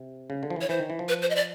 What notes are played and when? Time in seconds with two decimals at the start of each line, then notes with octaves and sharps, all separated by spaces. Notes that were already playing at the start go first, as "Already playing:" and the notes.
Already playing: C3
0.30 C#3
0.43 D3
0.50 F3
0.56 E3
0.61 C#5
0.69 E3 C5
0.80 D#3
0.90 E3
0.99 F3
1.09 B4
1.22 C5
1.30 D#5
1.36 D5